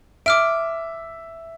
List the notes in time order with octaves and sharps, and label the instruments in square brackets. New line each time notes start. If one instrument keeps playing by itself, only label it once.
[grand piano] E5 [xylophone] D6 F6 D7